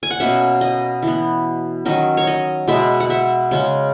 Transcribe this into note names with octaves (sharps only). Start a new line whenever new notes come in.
G#5
F#5
B2 A#3 C#4 E5
D#5
E3 B3
D#3 F#3 C#4 D#5
C#5
D#5
B2 G#3 B3 E5
F#5
E5
C#3 G#3 C#4